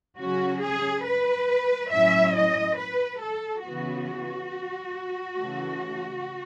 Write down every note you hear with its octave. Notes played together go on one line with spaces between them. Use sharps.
C#3 F#3 C#4 F#4
G#4
B4
A2 F#3 C#4 E4 E5
D#5
B4
A4
C#3 E3 B3 F#4
C#3 E3 A3